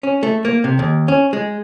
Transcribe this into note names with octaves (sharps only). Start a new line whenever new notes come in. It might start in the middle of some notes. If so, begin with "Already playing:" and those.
C#4
A3
A#3
C3
D#2
C#4
G#3